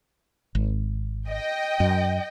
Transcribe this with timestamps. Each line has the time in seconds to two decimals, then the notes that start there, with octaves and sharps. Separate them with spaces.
0.55 G#1
1.28 D#5 G5
1.80 F#2